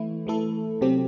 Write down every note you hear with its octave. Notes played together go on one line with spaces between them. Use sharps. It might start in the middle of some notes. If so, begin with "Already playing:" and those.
Already playing: E3 A3 E4
E3 A3 E4 A4
C3 F#3 C4 G4